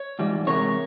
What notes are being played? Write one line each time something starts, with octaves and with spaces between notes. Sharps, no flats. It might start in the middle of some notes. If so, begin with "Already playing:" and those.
Already playing: C#5
G#2 E3 G3
C3 E3 G#3 A#4 C#5